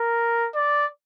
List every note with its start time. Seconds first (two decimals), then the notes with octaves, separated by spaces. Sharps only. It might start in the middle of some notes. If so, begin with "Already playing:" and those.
Already playing: A#4
0.54 D5